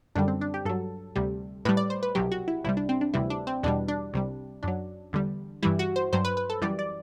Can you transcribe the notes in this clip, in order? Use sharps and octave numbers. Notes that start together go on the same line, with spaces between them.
F#2 D3 G3 D4
C4
D4
G4
G2 F#3 A4
D2 C3 G3
A2 G3 B4
D5
C5
B4
C2 B2 F#3 G4
F#4
E4
C2 C3 G3 E4
D4
C4
D4
D2 C3 E3 G3 E4
D4
C4
E2 B2 G3 D4
D4
C2 C3 G3
F#2 F#3 D4
E2 D3 G3
G2 E3 G3 E4
F#4
C5
G2 F#3 C5
B4
B4
A4
F#2 E3 G3 D5
D5